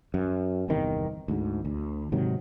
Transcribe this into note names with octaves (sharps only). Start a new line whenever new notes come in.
F#2
G1 E2 C3 D#3
D2 G#2
D2
G#2 C3 D#3 F#3